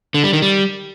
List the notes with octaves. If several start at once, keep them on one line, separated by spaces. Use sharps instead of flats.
D3
G3
D#3
G3